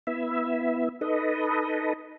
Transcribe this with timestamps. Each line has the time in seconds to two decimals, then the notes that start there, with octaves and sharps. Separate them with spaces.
0.07 B3 E4 E5
1.01 D#4 A4 B4 D#5